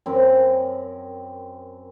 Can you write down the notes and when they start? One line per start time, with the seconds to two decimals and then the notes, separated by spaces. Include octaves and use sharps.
0.06 F#2 C4 A#4